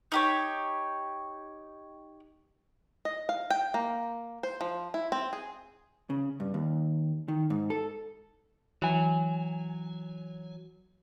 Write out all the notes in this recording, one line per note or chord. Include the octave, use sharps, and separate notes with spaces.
D#4 G4 C#5
D#5
F5
G5
A#3
C5
F3
E4
C4
G#4
C#3
G2
D#2
D#3
G#2
A4
E3 F#3 G#5